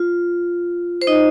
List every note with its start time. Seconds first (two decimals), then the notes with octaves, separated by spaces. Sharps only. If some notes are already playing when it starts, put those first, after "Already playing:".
Already playing: F4
1.02 C5
1.07 D#4 D#5